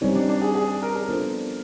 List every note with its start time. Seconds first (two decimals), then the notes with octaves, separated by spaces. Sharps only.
0.01 G3 C4 C#4 D#4 G4
0.15 D4
0.29 D4
0.42 G#4
0.55 G#4
0.68 G#4
0.83 A#4
0.95 A#4
1.09 B3 D4 F4 A4 C5